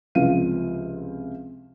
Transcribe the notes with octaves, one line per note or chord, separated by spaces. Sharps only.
C#2 C3 F3 F5 D#7